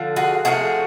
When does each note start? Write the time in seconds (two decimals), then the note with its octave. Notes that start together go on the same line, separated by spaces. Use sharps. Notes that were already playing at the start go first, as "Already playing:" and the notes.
Already playing: D3 F3
0.16 F#4 G#4
0.45 C3 F3 A3 F#4 G#4